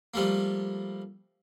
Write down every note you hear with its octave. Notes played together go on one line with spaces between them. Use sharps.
F3 G3 A3 A#3